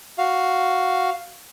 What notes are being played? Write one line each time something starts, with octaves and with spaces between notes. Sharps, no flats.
F#4 F5